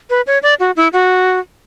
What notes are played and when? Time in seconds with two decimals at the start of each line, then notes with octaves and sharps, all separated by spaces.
0.10 B4
0.27 C#5
0.43 D5
0.60 F#4
0.76 E4
0.93 F#4